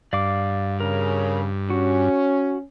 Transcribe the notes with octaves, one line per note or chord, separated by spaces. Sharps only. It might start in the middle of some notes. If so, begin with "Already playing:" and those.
G2 D5 F5 D6
C#3 A#4
C#4 F#4